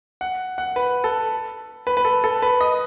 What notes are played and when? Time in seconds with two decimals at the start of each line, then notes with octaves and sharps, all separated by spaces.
0.21 F#5
0.58 F#5
0.76 B4
1.04 A4
1.87 B4
1.97 B4
2.05 A4
2.24 A4
2.42 B4
2.61 D#5